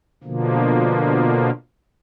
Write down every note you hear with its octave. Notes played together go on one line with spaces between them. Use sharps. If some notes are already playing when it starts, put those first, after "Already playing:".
B2 D3 F3 A#3